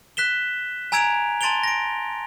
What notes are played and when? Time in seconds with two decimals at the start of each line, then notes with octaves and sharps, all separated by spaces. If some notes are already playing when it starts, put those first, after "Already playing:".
0.17 F#6 B6 E7 G7
0.92 G#5 A#5 E6 G#6 D7 F7
1.41 A5 C6 A6 D7 F7 G7
1.63 A#6 D7